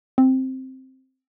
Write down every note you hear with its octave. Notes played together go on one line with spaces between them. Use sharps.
C4